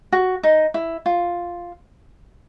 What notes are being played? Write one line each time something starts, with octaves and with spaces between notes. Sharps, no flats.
F#4
D#4
E4
F4